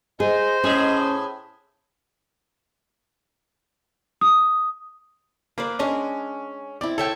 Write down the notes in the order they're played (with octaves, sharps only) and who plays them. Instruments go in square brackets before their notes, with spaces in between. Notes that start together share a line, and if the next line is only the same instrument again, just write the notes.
[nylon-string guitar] G#4 [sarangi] C5 [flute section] D#5
[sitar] A2 G#4 E5 [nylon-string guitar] C#4
[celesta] D#6
[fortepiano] A#3 [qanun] B4 C5 D5
[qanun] G#3 D4 A#4 [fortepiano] C#4
[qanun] C4 E4 [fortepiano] D5
[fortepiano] A4 G5 [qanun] C#5 E5 C#6